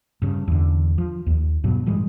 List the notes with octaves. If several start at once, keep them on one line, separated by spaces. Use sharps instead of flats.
G2 C#3
E2 D3
F3
D#2
G2 B2 F#3
A2 E3 G3 G#3